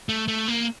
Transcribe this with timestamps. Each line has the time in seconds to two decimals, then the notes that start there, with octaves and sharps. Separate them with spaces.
0.09 A3
0.28 A3
0.48 A#3